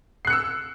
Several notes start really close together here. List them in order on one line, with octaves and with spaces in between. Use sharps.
C7 F#6 C#7 E6